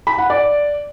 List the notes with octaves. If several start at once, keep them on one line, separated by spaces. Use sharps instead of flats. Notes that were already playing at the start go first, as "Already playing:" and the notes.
B5
F#5
D5